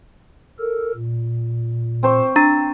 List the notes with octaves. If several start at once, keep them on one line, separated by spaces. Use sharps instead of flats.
A4 A#4
A#2
C4 C5 C#6
D4 A#5 A6